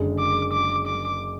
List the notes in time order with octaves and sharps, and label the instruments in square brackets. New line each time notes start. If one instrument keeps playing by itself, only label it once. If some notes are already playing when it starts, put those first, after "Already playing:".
Already playing: [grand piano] F#1 F#2 D3 G#3
[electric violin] D6
D6
D6